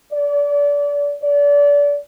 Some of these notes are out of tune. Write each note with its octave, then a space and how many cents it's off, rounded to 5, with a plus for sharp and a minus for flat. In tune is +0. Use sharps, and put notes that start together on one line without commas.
D5 -30
D5 -30